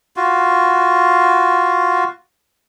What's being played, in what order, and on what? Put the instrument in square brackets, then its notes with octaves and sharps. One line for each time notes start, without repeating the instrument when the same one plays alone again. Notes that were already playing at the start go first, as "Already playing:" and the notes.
[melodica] F4 F#4